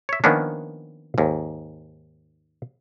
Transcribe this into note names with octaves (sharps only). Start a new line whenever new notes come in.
C#5 E5
D#3 F3 A#3 B3 C#4 D4
D#2 G#2